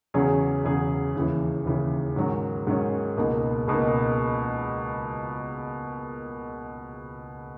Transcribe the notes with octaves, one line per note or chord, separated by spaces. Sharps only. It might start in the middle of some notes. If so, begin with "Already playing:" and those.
E2 C#3 F#3 C#4 G#4
E2 C#3 F#3 C#4 G#4
D#2 C#3 E3
D#2 C#3 E3
G#2 D#3 F#3 C#4
G#2 D#3 F#3 C#4
C#2 B2 A#3 D#4
C#2 B2 A#3 D#4